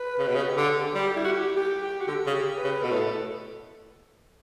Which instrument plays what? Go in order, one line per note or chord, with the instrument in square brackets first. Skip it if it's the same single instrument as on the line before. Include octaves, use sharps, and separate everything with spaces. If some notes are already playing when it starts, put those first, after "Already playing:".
Already playing: [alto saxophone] B4
[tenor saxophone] C#3
B2
C#3
[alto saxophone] G4
[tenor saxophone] D3 [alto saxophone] A4
[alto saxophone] G4
[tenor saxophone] G3
[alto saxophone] G4
E4
F#4
G4
G4
G4
F#4
[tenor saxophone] D3 [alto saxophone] G4
[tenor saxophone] C#3
[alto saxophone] G4
B4
[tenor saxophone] C#3
[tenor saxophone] B2 [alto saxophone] A4
[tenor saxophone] A2